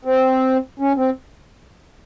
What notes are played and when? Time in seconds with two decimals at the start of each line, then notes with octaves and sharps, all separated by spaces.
0.05 C4
0.79 C#4
0.97 C4